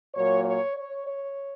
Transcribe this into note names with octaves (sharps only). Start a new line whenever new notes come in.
A#2 F#3 A#3 C#5
C#5
C#5
C#5